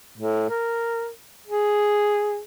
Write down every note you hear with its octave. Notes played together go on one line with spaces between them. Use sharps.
A2
A#4
G#4